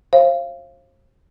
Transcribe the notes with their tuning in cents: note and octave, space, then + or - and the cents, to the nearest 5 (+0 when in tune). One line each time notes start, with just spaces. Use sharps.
C5 +40 F5 -25